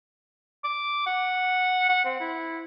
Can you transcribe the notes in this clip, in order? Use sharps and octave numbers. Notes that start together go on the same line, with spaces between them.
D6
F#5
F#5
C4
E4